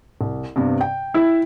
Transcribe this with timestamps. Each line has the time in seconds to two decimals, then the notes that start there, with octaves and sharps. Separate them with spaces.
0.21 C2
0.56 G2 C3 B3
0.81 G5
1.14 E4